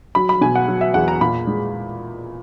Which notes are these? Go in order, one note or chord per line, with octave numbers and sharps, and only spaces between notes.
F#3 B5
B5
B2 G#5
F#5
F#3
E5
E2 F#5
A#5
A#2 B5
G#3